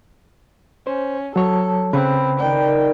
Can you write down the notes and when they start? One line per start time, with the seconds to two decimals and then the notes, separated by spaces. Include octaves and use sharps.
0.87 C#4 C5
1.36 F#3 A4 C#5
1.93 C#3 C4 B4
2.40 D#3 D4 G5